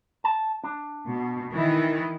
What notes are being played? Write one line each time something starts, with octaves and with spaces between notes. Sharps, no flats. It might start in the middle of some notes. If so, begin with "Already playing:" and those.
A5
D4
B2
D#3 E3 E4